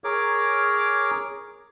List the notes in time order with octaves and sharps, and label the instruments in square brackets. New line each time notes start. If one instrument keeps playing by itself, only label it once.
[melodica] G#4 A#4 C#5 D6